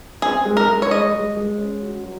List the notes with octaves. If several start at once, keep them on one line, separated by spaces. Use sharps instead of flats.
C4 G#4
G#3
A#4
G#3
C#5
G#3 D#5
G#3
G#3
C#4
F#4
F#3